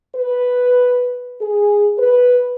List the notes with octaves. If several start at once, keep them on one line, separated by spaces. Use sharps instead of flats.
B4
G#4
B4